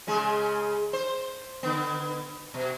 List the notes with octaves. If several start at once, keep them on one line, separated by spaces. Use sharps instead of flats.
C#3 G#3 G#4
C5
D3 B3
B2